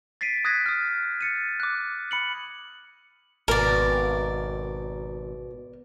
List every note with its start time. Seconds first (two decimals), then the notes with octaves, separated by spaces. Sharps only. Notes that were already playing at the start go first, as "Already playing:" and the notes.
0.21 A6 B6 C7 D7 D#7
0.45 D#6 F#6 G#6 A#6 B6
0.66 D#6 F6
1.21 A6 C#7 D#7
1.60 D6 F#6
2.11 B5 C#7 F#7
3.48 G#1 B2 A#4 D5